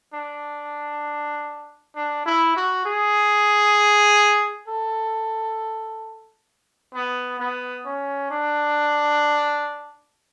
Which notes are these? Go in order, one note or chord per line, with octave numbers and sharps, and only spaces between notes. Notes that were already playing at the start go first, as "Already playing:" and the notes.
D4
D4
E4
F#4
G#4
A4
B3
B3
C#4
D4